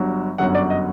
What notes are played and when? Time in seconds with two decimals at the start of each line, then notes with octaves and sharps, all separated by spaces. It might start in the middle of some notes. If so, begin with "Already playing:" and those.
Already playing: G1 G2 F#3
0.38 G1 F#2 D3 F#3 F#5
0.55 D5
0.70 D#5